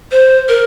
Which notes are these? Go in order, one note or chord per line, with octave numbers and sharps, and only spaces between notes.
C5
A#4